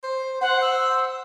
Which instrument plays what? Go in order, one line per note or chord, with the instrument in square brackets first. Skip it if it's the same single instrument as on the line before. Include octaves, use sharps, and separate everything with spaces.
[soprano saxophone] C5
[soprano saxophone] C5 [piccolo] F#5
[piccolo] E6